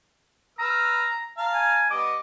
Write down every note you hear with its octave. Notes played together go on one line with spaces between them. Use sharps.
B4 A#5 E6 F6
F5 A5 A#5
G#5
G3 B3 D#5 D6